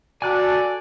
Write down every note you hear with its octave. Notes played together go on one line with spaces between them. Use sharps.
F#4 A4 D5 G#5 F#6